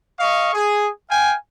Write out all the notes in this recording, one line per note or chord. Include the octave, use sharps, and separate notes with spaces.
D#5 F5 C#6
G#4
F5 G5 G#5